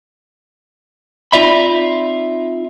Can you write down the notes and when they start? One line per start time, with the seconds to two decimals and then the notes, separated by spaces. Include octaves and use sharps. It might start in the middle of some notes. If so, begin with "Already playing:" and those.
1.32 C4 D#4 F4 D5 E5 B5